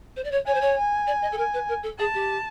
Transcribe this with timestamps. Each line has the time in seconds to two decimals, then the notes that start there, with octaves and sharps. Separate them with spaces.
0.16 C5
0.24 D5
0.31 C#5
0.46 C#5 G#5
0.54 C5
0.61 C#5
0.77 G#5
1.07 D5
1.22 D#5
1.32 A4
1.38 A#4 G#5
1.54 B4
1.68 A#4
1.83 A4
1.99 G#4 A5
2.14 G4